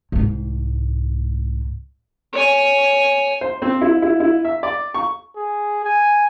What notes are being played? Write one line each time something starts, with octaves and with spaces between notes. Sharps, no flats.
C2 G#2
C#5 G#5
C5
C4
E4
E4
E4
E5
D5
C#6
G#4
G#5